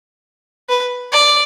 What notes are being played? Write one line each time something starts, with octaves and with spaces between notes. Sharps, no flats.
B4
D5